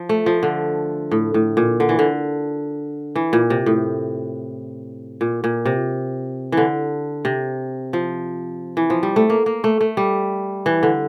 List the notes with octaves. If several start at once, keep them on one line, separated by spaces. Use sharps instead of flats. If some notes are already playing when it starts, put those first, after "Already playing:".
Already playing: F3
A3
F3
D3
A2
A2
A#2
D3
E3
D3
E3
A#2
C3
A2
A#2
A#2
C3
D3 E3
C3
F3
E3
F3
G3
A3
A#3
A#3
A3
A3
G3
E3
D3